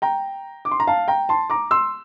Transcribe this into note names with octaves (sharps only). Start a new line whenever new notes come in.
G5 A#5
D6
C6
A#5
F5 A5
G5 A#5
A5 C6
A#5 D6
C6 E6